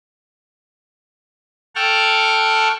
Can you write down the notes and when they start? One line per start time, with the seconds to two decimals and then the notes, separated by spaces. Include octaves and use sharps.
1.75 A4 F#5 G5 A5 C#6 F6